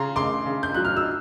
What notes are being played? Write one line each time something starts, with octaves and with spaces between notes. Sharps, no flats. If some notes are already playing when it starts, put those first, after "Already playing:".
Already playing: C#3 A#5 C6
C#3 C6 D6
C#3
G6
F#3 F#6
F6
E6